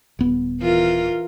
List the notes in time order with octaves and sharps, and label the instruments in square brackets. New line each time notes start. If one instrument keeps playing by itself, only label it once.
[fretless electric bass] D#1 B3
[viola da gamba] E3 F4 A#4